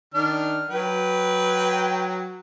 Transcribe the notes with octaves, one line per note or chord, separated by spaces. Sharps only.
D#3 D4 F6
F#3 B4 G5